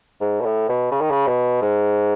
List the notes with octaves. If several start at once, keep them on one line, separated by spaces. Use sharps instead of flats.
G#2
B2
A2
B2
C#3
D#3
C#3
B2
G#2